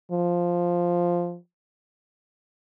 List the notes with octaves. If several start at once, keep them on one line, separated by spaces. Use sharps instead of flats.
F3